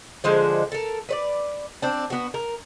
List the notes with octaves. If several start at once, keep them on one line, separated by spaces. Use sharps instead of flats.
D3 F3 G#3 C5
A4 A#4
B4 C#5 D5
C4 D4
B3 F#4
A#4